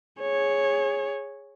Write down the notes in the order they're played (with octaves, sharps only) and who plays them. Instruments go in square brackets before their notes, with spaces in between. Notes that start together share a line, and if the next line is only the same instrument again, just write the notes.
[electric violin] G#4 C#5